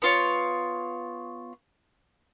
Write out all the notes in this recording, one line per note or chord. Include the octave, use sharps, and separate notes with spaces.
B3 F4 C#5